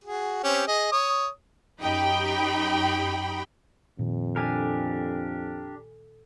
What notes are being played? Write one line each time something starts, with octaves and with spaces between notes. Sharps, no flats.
F#4 G#4
C4 C#4 G4
G#4 D#5
C#5 D#6
F#2 D#4 G4 G5 B5
F2 A#2 D#3
D4 G4 A4 A#4 G#5